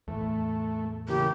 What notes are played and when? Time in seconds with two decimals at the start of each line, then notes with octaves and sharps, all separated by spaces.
0.08 E2 A2 A3
1.08 C#3 E3 A#3 G4